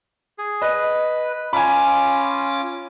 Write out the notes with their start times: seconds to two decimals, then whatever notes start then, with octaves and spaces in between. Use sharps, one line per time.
0.38 G#4
0.62 B4 D#5
1.53 C#4 F4 G#5 B5 D6